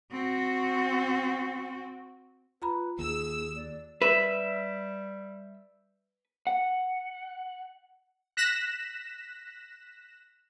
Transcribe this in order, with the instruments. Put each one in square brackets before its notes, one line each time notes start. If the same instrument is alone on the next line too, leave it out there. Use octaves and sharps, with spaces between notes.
[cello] C4 F#4
[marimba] F4 A#5 B5 [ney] B4
[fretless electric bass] D#2 [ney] G#4 [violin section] E6
[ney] D5
[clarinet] G3 [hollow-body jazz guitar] B4 [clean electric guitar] E5
[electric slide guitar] F#5
[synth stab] F#6 A#6 B6 E7